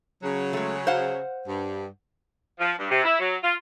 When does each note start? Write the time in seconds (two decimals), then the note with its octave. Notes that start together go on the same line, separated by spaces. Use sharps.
0.23 C#3 F#3
0.53 G#3 A3
0.87 C5 F5 F#5
1.48 G2
2.59 F3
2.79 G2
2.91 C3
3.04 E4
3.19 F#3
3.43 F4